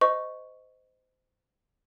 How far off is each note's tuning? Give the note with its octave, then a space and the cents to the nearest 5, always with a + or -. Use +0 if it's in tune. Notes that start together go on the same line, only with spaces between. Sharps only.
C5 -25 D#5 +0 C#6 +0